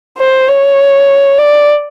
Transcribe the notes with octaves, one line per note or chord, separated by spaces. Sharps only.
C5
C#5
D5